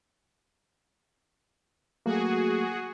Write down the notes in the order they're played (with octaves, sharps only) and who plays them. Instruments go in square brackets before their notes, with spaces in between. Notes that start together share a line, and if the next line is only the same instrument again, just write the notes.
[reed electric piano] F#3 A3 A#3 [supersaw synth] F#4 G#4